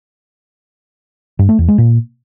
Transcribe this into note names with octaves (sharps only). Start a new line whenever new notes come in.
G2
A3
E2
G#3
A#2